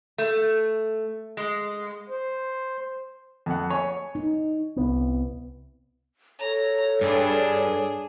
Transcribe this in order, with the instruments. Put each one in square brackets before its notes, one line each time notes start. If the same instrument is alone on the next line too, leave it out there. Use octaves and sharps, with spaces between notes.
[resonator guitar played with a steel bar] A3
G#3
[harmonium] C5
[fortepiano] F2 F#5
C#5 G#5
[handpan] D#4
[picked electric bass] C2 B3
[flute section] A4 C#5 [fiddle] A#5
[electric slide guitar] G2 [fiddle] D4 G#4